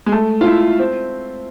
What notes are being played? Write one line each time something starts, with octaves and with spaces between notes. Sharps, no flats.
G#3
A3
F4
E4
C4